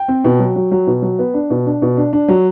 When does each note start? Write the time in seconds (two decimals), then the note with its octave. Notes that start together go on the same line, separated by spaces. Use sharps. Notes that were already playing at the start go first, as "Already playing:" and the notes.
Already playing: G5
0.08 C4
0.24 B2
0.39 F#3
0.56 F#3
0.72 F#3
0.87 B2
1.02 F#3
1.19 B3
1.34 D4
1.50 B2
1.66 D4
1.82 B2
1.97 D4
2.13 D4
2.28 F#3